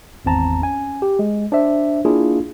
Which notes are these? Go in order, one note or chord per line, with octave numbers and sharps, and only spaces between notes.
G#1 E2 C4 A5 A#5
C#4 G#5
G4
G#3
D4 C5 E5
A#3 D4 E4 F4 G#4